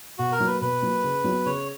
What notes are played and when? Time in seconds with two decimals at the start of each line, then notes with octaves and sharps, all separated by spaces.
0.18 B2 F#4
0.32 A#4
0.39 F#3 A#3
0.46 B4
0.61 B2 B4
0.82 F#3 A#3
1.04 C#3
1.24 F#3 B3
1.46 C#3 C#5